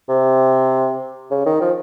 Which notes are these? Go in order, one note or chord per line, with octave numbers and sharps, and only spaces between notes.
C3
C#3
D#3
F3